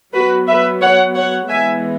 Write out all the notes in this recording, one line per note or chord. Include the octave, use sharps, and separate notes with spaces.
F#3 B3 F#4 B4
B4 E5
C#5 F#5
C#5 F#5
E3 G#3 B3 E5 G#5